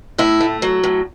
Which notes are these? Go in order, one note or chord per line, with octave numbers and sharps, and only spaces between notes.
A2 E4
A3
F#3
A2